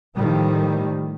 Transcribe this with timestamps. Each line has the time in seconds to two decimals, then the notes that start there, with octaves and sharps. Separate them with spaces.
0.16 A2 D#3 F3 G3